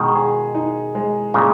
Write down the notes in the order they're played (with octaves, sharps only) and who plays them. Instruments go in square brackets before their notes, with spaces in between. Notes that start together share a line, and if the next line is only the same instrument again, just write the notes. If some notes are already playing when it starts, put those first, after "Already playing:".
Already playing: [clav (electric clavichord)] B2 D#3 [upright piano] G#3
[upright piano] G#4
D#4
G#3
[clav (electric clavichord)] A#2 C#3 [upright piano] G#3